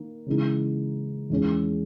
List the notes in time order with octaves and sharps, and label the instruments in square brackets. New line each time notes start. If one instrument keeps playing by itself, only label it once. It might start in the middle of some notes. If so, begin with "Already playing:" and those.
Already playing: [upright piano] D#3 A#3
C#3 E3 G#3 D#4
E2 D#3 G#3 C#4